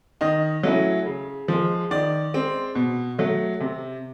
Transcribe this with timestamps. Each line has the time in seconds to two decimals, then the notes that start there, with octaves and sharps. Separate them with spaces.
0.21 D#3 D#5
0.63 F#3 A3 C#4 E4
1.06 C#3
1.48 F3 G#3
1.91 D#3 D5
2.34 G#3 C4
2.75 B2
3.18 F#3 A3
3.60 C3